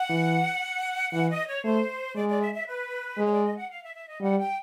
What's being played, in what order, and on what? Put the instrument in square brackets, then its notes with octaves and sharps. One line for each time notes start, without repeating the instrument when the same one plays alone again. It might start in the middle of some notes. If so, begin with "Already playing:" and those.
Already playing: [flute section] F#5
[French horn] E3
[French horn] E3 [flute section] F#5
[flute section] D#5
C#5
[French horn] A3 [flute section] C5
[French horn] G#3 [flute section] D5
[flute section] D5
E5
E5
B4
[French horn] G#3
[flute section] C#5
D5
D#5
F#5
F5
E5
E5
D#5
[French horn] G3 [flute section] F#5
[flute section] G5